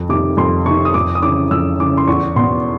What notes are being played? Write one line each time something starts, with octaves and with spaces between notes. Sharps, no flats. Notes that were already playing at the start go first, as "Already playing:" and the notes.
Already playing: F2
C3 D#3 D6
F2 C6
C3 D#3 C#6
D#6
F2 D6
D#6
C#3 E3 D6
F2 E6
C#3 E3 D6
C6
E2 C#6
B2 C6